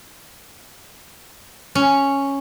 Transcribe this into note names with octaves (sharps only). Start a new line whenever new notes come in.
C#4